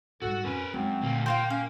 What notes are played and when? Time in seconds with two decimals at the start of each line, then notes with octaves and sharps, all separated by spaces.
0.22 G#2 G3 F#4 A4
0.44 F2 C#4 A#4 B4
0.74 F#2 G#3 C4 D#4
1.02 D2 A#2 A#3
1.26 A#3 F4 F#4 C5 G5
1.50 C#4 F5